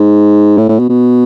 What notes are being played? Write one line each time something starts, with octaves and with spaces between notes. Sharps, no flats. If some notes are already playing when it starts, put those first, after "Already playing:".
Already playing: G#2
A2
A2
B2
B2